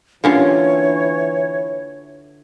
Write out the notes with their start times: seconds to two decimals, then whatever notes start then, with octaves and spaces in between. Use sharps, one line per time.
0.24 D3 E3 A#3 C#4 F4 G4 C#5